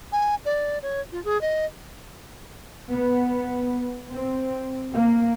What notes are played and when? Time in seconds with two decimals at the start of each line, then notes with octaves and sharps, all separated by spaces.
0.12 G#5
0.45 D5
0.82 C#5
1.12 F4
1.25 G#4
1.41 D#5
2.92 B3
4.13 C4
4.94 A#3